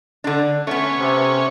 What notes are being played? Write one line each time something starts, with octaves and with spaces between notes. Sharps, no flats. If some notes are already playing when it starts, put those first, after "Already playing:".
D3 D4
A3 B3 C#4
C3